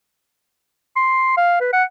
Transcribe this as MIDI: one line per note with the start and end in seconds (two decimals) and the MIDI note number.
0.96 1.35 84
1.37 1.59 77
1.61 1.72 71
1.73 1.84 78